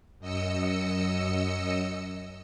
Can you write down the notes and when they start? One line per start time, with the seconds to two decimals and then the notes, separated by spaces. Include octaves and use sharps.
0.19 F#2 D#5 E6 C#7